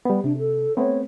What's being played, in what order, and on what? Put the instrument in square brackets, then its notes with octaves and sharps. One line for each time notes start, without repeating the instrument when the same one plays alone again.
[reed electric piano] G3 B3
[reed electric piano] C3 [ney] D4
[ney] A4
[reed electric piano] A3 B3 C4 [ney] C#5